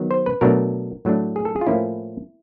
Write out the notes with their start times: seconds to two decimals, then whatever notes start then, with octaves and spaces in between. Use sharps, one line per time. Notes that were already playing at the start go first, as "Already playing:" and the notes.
Already playing: D#3 F#3 B3
0.11 C5
0.26 B4
0.41 B2 F#3 A3 D4 A#4
1.05 A2 F#3 A3 D4
1.36 G#4
1.45 A4
1.56 G#4
1.61 F4
1.67 A2 F3 A#3 C#4 E4